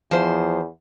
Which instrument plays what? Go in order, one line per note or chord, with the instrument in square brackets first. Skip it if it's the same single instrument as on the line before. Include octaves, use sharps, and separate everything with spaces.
[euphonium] E2 [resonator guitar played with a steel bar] F3 C5